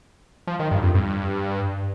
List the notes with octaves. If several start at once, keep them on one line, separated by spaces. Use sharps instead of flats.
F3
D#3
G2
F2
G2